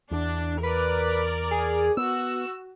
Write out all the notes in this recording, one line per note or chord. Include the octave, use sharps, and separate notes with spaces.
E2 D4
A#4 B4 D5
G#4
B3 F#4 E6